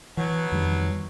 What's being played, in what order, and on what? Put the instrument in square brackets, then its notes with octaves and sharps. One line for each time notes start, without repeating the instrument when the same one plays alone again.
[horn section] B2 F#3 [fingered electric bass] E3
[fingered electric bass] F2 D#3 G3